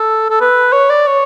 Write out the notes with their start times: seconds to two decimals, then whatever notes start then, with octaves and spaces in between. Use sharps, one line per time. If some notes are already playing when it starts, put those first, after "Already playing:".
Already playing: A4
0.30 A4
0.41 B4
0.73 C#5
0.90 D5
1.07 C#5